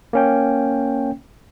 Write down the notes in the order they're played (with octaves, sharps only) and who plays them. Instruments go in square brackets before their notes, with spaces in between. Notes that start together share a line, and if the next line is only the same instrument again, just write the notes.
[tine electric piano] A#3 C#4 G5